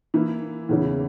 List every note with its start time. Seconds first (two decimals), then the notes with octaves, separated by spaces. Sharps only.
0.14 E3 A#3 E4
0.69 E2 C#3 E3